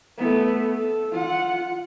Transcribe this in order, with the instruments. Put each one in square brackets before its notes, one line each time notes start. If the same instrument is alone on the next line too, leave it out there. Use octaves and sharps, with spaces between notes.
[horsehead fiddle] A3 B3
A4
F4 F#5